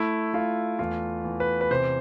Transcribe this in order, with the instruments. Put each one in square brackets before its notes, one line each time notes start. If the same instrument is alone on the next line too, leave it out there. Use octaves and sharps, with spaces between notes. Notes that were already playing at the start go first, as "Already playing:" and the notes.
Already playing: [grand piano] A3 E4
A3 F4
E2 F4
E2
B4
B4
C3 C5